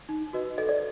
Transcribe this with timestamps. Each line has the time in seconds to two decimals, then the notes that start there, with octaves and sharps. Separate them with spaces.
0.09 D#4
0.33 F#4 B4 D#5
0.58 A4 D#5
0.69 D5